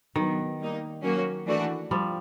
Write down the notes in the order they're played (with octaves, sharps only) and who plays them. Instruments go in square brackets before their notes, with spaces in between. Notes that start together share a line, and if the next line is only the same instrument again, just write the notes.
[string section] B2 F#3 B3 [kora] D#3
[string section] G3 A#3 D#4
F#3 A#3 C#4 F#4
E3 A3 D4 F#4
[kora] F3 G3